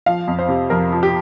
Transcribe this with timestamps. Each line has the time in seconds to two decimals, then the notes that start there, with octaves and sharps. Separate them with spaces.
0.06 F3 F5
0.28 F2
0.39 C5
0.48 C3
0.70 F2 A#4
0.92 F3
1.03 G4